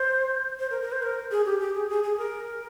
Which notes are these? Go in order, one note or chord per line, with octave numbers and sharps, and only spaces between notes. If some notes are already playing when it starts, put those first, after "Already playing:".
Already playing: C5
C5
A#4
A#4
C5
A#4
G#4
G4
G4
G#4
G#4
G#4
A#4